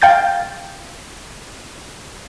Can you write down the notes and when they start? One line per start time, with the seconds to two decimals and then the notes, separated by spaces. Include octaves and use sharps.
0.02 F5 G5 G6 A6